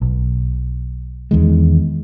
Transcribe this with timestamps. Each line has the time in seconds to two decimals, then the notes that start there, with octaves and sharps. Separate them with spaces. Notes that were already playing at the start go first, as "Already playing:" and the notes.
0.01 B1
1.31 E2 D#3 G#3